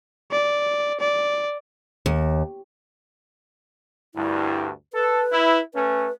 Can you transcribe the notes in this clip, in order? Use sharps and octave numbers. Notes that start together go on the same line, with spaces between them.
D5
D5
D#2
D2 G2 E4
A4 B4
E4
A3 C#4 B4